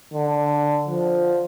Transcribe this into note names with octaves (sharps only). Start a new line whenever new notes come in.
D3
F3